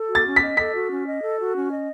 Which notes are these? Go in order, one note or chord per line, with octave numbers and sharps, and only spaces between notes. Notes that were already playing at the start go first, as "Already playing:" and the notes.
Already playing: A4
F#4
A6
C#4
B6
D#5
A4 B6
F#4
C#4
D#5
A4
F#4
C#4
D#5